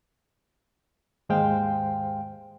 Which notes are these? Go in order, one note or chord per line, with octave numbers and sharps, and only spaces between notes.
D#2 G#2 G#3 C5 F5 G5